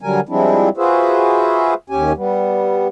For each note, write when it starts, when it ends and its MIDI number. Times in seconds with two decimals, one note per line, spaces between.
0.01 0.20 50
0.01 0.20 54
0.01 0.20 55
0.01 0.20 70
0.01 0.20 80
0.29 0.69 53
0.29 0.69 55
0.29 0.69 56
0.29 0.69 60
0.29 0.69 62
0.29 0.69 64
0.77 1.74 65
0.77 1.74 66
0.77 1.74 68
0.77 1.74 71
0.77 1.74 72
0.77 1.74 76
1.90 2.13 39
1.90 2.13 61
1.90 2.13 67
1.90 2.13 80
2.16 2.88 55
2.16 2.88 59